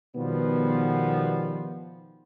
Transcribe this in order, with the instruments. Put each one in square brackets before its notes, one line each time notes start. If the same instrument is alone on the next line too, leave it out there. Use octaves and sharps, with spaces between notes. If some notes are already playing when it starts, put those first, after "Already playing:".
[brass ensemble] B2 D#3 F3 G3 B3